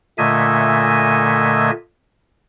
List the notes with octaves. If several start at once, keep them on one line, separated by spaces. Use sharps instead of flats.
A#2 D3 A3 D#5 E5 G#5